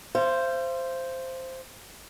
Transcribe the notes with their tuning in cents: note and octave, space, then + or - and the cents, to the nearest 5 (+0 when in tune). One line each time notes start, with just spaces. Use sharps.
C5 +0 F5 -45